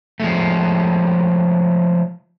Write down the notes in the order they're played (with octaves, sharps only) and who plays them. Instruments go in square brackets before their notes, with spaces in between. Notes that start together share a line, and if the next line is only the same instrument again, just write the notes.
[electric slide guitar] F3 G#3 A3